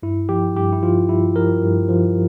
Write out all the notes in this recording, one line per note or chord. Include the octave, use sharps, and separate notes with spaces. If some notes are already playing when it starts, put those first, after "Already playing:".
G2 E4
F3 G4
G2 G4
E4
F3 F4
G2 E4
F3 A#4
G2
F3